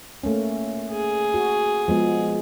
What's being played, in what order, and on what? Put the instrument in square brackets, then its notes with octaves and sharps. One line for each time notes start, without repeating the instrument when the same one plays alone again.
[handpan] A3 A#3 C#4
[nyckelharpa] G#4
[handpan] F#4
F3 G#3 B3